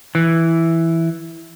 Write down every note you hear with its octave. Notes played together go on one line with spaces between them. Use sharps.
E3